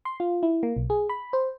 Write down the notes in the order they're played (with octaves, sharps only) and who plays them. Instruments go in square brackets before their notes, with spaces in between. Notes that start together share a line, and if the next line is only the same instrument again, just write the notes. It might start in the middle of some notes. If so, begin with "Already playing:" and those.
[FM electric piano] C6
F4
E4
A#3
B1
G#4
B5
C5